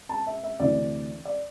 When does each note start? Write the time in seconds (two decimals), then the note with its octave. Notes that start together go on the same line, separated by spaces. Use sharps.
0.09 A5
0.27 E5
0.43 E5
0.60 D2 C3 E3 D5
1.25 D5